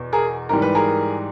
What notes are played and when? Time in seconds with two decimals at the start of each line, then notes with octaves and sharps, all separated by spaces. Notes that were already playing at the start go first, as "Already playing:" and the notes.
Already playing: E2 B2
0.13 G#4 A#4
0.49 G#2 E3 G3 A#4
0.62 B4
0.75 G#4 A#4